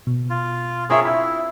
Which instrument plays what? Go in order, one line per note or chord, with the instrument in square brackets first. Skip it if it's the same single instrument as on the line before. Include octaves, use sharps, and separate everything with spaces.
[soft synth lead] B2
[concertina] F4
[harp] C4 F4 E5 [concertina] G#4 A#4 C#5
[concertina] E4 [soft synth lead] B5